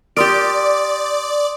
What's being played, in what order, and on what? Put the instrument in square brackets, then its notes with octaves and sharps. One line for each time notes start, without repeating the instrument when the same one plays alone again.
[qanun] G4 A#4 [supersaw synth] D5 [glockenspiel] C6 D#6 D7